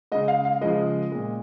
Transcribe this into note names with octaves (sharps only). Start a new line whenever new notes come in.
C#3 G#3 D#5
F5
F5
C#3 F3 G#3 D#5
A#2 G#3